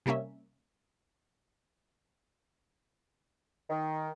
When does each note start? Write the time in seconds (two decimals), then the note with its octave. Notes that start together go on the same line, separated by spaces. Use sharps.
0.06 C3 G3 A#3 C#4 E5
3.70 D#3